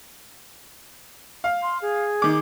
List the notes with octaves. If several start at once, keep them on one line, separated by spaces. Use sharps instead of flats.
F5
C6
G#4
D#3 D6